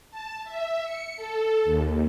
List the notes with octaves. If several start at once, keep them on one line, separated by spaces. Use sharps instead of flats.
A5
E5
C#7
A4
D#2